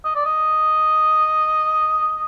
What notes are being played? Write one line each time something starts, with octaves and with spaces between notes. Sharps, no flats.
D#5
D5
D#5